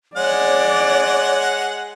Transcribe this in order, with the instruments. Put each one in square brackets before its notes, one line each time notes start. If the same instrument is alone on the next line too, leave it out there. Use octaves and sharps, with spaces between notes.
[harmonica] G#3 F#5 [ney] C#5 [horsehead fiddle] D5